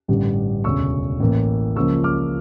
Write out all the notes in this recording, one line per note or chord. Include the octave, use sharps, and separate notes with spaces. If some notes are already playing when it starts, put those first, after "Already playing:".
A1 G2 D3 G3
E1 D2 C#3 C#6 E6
A1 A2 E3 A#3
C#2 C#3 F3 A#3 C#6 E6
D6 F6